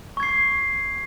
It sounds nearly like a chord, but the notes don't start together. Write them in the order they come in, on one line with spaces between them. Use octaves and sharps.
C#6 G#6 C7